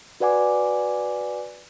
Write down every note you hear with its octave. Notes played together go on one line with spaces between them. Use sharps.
F#4 B4 D5 F#5 G#5 D6